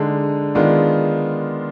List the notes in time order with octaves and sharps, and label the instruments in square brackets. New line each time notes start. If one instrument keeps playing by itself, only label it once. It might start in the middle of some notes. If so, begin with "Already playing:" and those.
Already playing: [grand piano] D3 G#3 D#4
D#3 G#3 B3 D4 F4